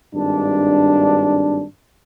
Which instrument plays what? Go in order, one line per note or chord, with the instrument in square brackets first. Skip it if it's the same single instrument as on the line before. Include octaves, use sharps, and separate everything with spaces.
[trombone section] G#1 G2 D4